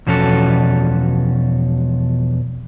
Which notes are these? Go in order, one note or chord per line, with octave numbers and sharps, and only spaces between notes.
E2 B2 F3 C#4 F#4 A4